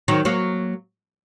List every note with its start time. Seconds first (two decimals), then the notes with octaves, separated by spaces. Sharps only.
0.08 D#3 F#3
0.25 F#3 A#3